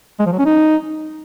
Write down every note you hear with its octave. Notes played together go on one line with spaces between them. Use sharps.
G#3
F3
F#3
C#4
D#4